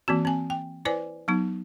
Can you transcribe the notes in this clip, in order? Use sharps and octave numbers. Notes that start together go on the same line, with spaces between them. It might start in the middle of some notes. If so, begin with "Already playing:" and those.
E3 A#3 C4 F#4
C4 G#5
G5
E4 B4 C5 D5 G#5
F#3 B3 D#4